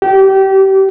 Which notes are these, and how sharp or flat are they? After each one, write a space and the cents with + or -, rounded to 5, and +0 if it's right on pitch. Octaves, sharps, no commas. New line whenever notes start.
G4 -25